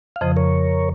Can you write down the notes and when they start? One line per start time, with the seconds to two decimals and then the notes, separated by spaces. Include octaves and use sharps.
0.16 F5
0.21 F2 C#3 F3 C5 D#5
0.36 A#4 C#5